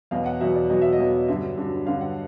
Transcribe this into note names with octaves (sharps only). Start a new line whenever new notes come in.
E2 B2 F#3 F5
F#5
E2 B2 F#3 E5
D5
E2 B2 F#3 D#5
E5
D#5
E2 B2 F#3
G2 D3 F#3 E5
G2 D3 F#3
G2 D3 F#3 F5
F#5